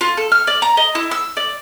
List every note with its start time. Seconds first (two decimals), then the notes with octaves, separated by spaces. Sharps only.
0.01 F4
0.17 A4
0.32 F6
0.47 D5
0.62 A#5
0.77 D#5
0.95 E4
1.11 E6
1.37 D5